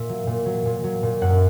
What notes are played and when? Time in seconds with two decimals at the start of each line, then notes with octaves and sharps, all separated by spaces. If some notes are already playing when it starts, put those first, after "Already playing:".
Already playing: A#2 E5
0.09 F#3
0.27 A#2
0.46 F#3
0.65 A#2
0.84 F#3
1.03 A#2
1.21 F#2 F#5